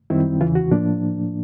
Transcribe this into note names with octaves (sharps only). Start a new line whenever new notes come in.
F#2 D#3 G3 C4 E4
E2 C#3 E3 F4
F#4
A2 F3 A#3 D4